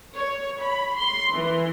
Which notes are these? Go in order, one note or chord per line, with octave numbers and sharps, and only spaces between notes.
C#5
B5
C6
E3